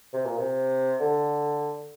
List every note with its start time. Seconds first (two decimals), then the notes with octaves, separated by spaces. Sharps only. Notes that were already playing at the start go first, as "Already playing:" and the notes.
0.14 C3
0.25 A#2
0.38 C3
1.01 D3